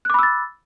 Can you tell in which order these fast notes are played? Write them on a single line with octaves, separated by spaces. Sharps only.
F#6 D6 B5 E6 A6